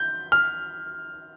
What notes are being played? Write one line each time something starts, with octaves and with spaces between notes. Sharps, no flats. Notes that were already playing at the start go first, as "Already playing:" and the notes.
Already playing: G6
F6